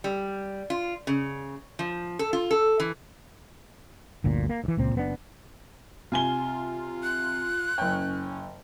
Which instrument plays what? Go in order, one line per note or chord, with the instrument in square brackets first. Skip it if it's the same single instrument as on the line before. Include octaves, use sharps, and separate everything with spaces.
[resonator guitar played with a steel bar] G3
F4
C#3
F3
A4
F4
A4
E3
[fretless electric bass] G1 D2 A#2
A#3
D2 E3
C#2 A#2 C4
F#1 B3 D4
[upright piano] C3 G#5 G7 [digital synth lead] F4
[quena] F#6
[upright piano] F#1 G5 [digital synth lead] C#4